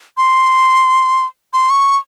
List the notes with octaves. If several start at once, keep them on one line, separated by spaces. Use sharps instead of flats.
C6
C6
C#6